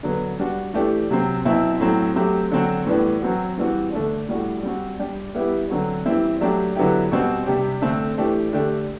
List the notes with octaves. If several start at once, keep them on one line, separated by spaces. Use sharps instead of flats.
D3 F#3 B3
G3 D4 F#4
E3 A3 D4 G4
C3 F#3 C4
B2 F#3 C4 E4
A2 F#3 C4
F#3 A3 C4 G4
D3 F#3 C4 F#4
A2 E3 G3 B3 D4
F#3 C4 F#4
E3 G3 C4 F#4
D3 A3 D4
A2 G3 D4 F#4
G3 C4 F#4
G3 D4 G4
G3 B3 E4 G4
D3 F#3 C4 F#4
E3 G3 C4 E4
F#3 A3 D4 G4
D3 F#3 B3 E4 G4
B2 G3 C4 F#4
C3 G3 D4 G4
D3 A3 C4
E3 A3 D4 G4
D3 A3 D4 G4